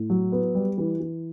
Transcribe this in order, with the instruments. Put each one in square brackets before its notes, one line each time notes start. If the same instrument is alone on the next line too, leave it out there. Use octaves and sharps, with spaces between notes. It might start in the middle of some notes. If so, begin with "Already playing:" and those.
Already playing: [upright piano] A2
F#3
B3
G3
E3
E3